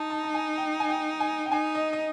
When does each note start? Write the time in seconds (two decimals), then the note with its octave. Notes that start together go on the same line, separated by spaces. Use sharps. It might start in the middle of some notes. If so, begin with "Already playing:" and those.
Already playing: D#4 A5
0.10 A5
0.23 A5
0.34 G#5
0.58 G5
0.80 G#5
0.89 G5
1.20 G#5
1.46 G5
1.51 D#4 G#5
1.75 D#5
1.93 D#5